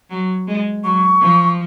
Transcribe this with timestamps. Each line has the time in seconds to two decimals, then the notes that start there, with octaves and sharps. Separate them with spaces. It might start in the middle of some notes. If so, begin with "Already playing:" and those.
0.10 F#3
0.47 G#3
0.84 F#3 C#6
1.21 F3